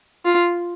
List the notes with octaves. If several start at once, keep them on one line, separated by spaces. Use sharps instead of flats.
F4